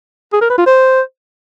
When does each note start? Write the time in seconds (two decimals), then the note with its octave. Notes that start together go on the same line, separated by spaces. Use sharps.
0.33 G#4
0.41 A#4
0.49 B4
0.58 F4
0.66 C5